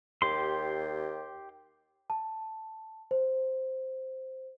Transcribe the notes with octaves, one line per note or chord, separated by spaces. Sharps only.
D#2 G4 C6
A5
C5